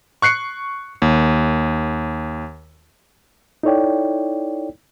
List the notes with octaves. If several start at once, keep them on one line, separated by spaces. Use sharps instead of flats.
C#6 F#6 C7 C#7
D#2
D#4 E4 A4 C#5 D5 G5